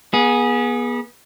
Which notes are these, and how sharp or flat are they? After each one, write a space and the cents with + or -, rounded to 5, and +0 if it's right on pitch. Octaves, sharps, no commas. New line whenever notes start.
B3 -35 G#4 +0